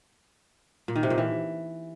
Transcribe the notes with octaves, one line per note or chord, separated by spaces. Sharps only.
A#2
D#3
C3
A#2
E3